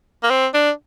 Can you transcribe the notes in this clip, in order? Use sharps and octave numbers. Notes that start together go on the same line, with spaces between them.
A#3
C4
D4